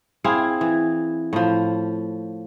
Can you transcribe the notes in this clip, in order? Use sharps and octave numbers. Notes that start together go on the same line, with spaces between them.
C4 E4 G#4 F5
E3
A2 F3